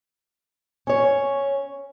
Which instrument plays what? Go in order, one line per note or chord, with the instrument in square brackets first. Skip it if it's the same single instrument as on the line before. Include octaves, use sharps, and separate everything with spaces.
[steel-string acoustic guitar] C#4 C#5